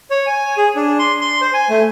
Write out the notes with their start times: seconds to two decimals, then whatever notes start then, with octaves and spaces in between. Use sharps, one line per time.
0.11 C#5
0.26 G#5
0.57 G#4
0.76 D4
0.99 C6
1.21 C6
1.41 C5
1.54 G#5
1.70 A3